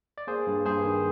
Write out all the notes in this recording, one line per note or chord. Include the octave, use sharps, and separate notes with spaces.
D5
A#3 G#4 C5
G2
G2 G#4 C5
D#3